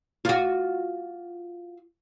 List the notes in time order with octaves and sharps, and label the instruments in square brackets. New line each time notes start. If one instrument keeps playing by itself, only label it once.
[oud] F4 F#4